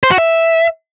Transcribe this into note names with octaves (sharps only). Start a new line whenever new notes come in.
C5
F#4
E5